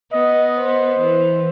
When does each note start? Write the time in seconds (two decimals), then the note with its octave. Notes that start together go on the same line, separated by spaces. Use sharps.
0.12 B3 D#5
0.58 C5
0.99 E3